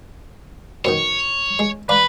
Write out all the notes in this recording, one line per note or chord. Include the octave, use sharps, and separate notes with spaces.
F#2 B2 D#3 C#5
G#3
B4 D5 F5 A#5